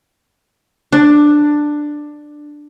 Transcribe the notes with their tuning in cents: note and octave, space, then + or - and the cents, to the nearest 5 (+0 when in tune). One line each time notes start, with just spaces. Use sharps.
D4 +10